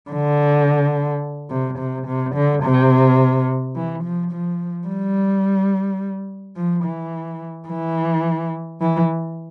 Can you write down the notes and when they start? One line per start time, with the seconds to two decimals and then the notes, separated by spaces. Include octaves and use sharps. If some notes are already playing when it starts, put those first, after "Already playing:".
0.11 D3
1.51 C3
1.79 C3
2.07 C3
2.35 D3
2.63 C3
3.76 E3
4.04 F3
4.32 F3
4.88 G3
6.56 F3
6.84 E3
7.68 E3
8.81 E3